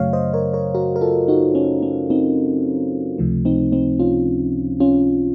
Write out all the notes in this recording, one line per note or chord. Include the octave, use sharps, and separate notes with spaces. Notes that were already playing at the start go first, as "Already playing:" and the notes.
Already playing: F#2 C#3 F#3 A3 C#5 F5
C5 D#5
A#4 C#5
A#4 C#5
F#4 A#4
A#4
F4 A4
D#4 F#4
C#4
C#4
C4 D#4
C#2 C3 F3 A3
C4 D#4
C4 D#4
C#4 F4
C#4 F4